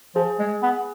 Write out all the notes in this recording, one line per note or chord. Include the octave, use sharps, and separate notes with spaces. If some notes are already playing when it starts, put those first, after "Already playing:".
F3 G#4
G#3
B3